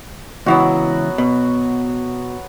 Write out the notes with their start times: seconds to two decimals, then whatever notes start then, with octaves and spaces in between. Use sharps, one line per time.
0.46 C#2 E3 F#3 B3 E4 F#4
1.18 B2